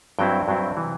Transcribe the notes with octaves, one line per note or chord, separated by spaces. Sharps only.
G2 F#3 C4 E4 G5
G2 F#3 C4 E4
C3 E3